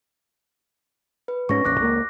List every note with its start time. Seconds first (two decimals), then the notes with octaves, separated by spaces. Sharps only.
1.28 B4
1.49 G#2 C#4 C#6 A#6
1.65 E1 A#1 C#4 D6 F#6 A#6
1.80 C#2 A#3